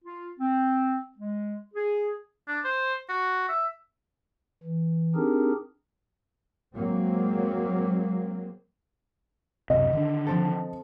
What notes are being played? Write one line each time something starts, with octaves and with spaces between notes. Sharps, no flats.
F4
C4
G#3
G#4
D4
C5
F#4
E5
E3
C4 D4 D#4 G4 G#4 A#4
F#3 G#3 A#3 C4
C#2 F#2 C3 D#5
D3 D#3 D4
F3 C4 A4